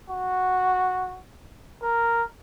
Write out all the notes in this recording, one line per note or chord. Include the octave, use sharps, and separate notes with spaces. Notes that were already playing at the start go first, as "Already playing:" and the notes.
F#4
A#4